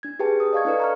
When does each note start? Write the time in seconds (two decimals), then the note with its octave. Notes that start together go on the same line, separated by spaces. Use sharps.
0.03 D4 G#6
0.19 G4 G#4 B4 G5 A5
0.40 A#4 D#6
0.53 D5 D#5 F5 A5 C#6 G#6
0.65 D4 E4 A4 B4 D5
0.80 A#5 C#6 F6